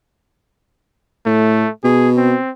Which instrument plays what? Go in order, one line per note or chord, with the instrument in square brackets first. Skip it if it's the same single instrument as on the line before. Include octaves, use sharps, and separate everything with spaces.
[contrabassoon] A2 [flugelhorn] A3
[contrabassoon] B2 [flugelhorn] G#4
[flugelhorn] C4